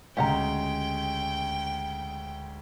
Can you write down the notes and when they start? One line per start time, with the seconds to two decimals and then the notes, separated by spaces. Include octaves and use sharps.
0.17 D2 C#3 G#3 G4 F#5 G5 A#5